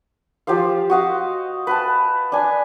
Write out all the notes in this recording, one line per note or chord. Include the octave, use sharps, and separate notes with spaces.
F3 G4 C5 F5
F#4 D#5 F5
B4 G5 A5
D4 G#5